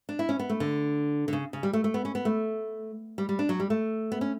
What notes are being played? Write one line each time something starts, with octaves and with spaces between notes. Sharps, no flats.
D4
E4
C#4
B3
A3
D3
D3
C#3
C#3
G3
A3
A3
B3
C#4
B3
A3
G3
G3
D4
F#3
G3
A3
B3
C#4